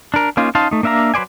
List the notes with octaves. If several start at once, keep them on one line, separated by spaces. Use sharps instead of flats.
D4 A#4
A#3 C#4 D#4 F4
C#4 D#4 F5 A5 C6
A3 D#4
A#3 D4 E5 F5 A#5
F#3 B4 C5 D5 G#5